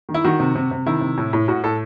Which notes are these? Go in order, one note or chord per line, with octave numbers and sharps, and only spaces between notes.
D#3
E4
D#3 F#4
C3
C3
C3
D#3 E4
C3
A2
A2
A2 F#4
A2 A4